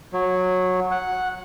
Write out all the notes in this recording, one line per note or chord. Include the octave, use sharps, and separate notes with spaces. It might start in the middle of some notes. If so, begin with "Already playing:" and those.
F#3
F#5